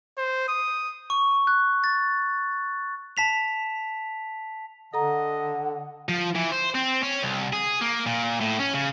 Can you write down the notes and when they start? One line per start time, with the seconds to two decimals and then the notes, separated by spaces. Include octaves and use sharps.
0.17 C5
0.48 D#6
1.10 C#6
1.47 F#6
1.84 A6
3.17 A5 B6 F7
4.94 D3 A4 D#5 F#5 A#5
6.09 F3
6.35 E3
6.52 C5
6.75 C4
7.03 C#4
7.23 C2
7.53 G#4
7.81 A#3
8.06 A#2
8.40 A2
8.59 C#4
8.74 C#3